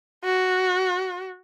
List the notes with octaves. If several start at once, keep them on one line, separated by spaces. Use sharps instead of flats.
F#4